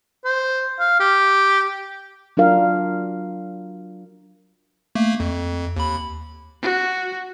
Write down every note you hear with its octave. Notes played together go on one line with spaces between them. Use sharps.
C5
F5
G4
F#3 D4 F4 A#4 F5
A3 A#3
F2
D#2 B5
F#4